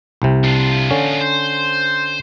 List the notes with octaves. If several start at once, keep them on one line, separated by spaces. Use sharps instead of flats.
C2 C3
D4 F4
D3 C#4
C5